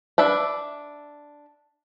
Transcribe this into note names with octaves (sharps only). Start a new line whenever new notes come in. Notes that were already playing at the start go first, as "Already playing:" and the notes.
D4 B4 E5